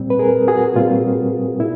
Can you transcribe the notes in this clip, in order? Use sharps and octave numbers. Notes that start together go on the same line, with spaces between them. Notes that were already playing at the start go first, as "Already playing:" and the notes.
Already playing: A#2 G3 C4
B4
G#4 A#4
F#4 G#4
A#2 G3 C4 F4
A#2 E4